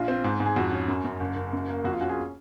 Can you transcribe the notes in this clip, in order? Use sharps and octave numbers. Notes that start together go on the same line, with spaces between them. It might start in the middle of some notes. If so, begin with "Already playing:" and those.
Already playing: A#1 F4
C4
G#2
G#2
G#4
F2 F#4
C#4
F#2
F#2
F#1
F#1
F#2
A#3
F2 F#4
F4
C#4 F#4
F4 G#4